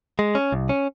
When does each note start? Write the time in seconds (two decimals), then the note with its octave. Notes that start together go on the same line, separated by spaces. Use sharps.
0.19 G#3
0.35 C#4
0.52 C2
0.69 C#4